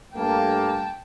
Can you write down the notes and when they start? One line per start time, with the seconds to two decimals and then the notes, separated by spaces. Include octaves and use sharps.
0.15 G2 A3 A#3 G5 A5